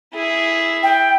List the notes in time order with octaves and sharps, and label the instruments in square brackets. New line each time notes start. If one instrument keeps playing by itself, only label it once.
[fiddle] E4 G#4
[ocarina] G5